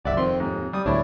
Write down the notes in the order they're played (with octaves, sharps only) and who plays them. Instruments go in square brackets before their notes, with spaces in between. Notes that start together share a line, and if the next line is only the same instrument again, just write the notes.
[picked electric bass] F#1 C2 [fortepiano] D5 E5 [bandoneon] F#5 D6
[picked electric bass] F2 [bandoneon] D#3 C4 [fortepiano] C6
[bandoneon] D#2 [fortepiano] G#2
[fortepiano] G3 [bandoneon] D#6
[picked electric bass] D1 D2 [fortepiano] D4 [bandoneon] E4 C#5